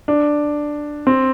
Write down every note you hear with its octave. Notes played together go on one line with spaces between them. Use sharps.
D4
C4